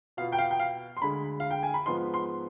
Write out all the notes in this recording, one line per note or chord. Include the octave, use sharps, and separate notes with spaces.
B2 B3 F4 F5
G5
F5
G5
F5
C6
D2 D3 G#3 B5
F5
G5
G#5
B5
G#2 F3 B3 D#4 C6
C6